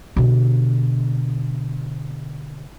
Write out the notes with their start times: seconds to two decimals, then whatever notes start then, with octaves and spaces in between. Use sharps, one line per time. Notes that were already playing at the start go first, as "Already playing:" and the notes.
0.17 B2 D3